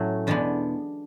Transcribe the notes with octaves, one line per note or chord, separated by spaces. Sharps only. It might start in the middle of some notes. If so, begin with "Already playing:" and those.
Already playing: A2 F#3 A3 C#4
E2 B2 G#3 B3 D4